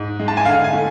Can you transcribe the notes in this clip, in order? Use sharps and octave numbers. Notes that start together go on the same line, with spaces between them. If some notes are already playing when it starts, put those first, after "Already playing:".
Already playing: G#2
G#3
A5
G#5
D3 F5
G#5
A3